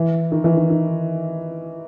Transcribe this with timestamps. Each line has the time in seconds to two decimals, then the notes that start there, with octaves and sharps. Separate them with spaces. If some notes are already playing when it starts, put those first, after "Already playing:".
Already playing: E3
0.32 D#3
0.44 E3
0.57 D#3
0.70 D#3